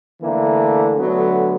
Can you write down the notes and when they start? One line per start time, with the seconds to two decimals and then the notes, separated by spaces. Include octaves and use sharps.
0.21 D3 E3 A3 A#3
0.98 D3 F#3 A3 B3